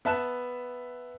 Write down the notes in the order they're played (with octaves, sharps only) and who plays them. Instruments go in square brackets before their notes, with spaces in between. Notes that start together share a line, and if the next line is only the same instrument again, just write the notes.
[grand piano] B3 E5 A5 F#6 E7